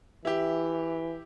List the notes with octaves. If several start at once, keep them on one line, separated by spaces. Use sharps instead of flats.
E3 E4 G4